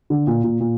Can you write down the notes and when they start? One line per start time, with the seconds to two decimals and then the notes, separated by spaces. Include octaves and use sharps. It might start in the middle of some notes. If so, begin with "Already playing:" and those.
0.10 D3
0.27 A#2
0.44 A#2
0.61 A#2